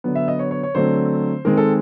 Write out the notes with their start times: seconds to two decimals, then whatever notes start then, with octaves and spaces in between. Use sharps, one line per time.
0.04 D3 F#3 B3
0.15 E5
0.28 D#5
0.39 C#5
0.51 C#5
0.63 C#5
0.75 D3 F#3 A3 C4 C5
1.45 D#3 G#3 C4 A#4
1.57 A4